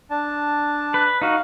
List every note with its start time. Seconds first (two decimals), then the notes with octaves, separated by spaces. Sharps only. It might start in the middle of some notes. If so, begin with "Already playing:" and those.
0.10 D4 A5
0.94 B4
1.22 D#4 F#4 F5